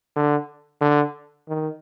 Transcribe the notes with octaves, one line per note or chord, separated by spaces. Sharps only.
D3
D3
D#3